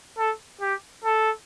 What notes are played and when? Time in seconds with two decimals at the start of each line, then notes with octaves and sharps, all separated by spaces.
0.18 A4
0.61 G4
1.04 A4